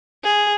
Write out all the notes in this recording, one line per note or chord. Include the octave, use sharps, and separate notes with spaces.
G#4